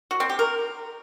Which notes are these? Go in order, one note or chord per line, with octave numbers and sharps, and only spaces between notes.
F#4
C4
G4
A#4